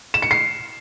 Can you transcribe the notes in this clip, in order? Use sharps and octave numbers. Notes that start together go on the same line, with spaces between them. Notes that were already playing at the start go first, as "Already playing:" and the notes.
E7
C#7
C7